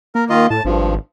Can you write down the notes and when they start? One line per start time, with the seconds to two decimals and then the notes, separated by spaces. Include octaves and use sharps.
0.15 A#3 A#4
0.30 D#3 F4 D#5
0.50 A2 A5
0.65 G#1 G2 F3